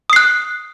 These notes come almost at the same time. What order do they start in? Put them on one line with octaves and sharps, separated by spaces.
D#6 C7 F#6